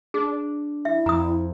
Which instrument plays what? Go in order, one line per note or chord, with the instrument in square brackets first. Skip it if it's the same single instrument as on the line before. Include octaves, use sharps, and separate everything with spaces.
[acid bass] D4 [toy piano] G#4
[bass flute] E4 [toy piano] E5
[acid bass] F2 [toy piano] A#5 D#6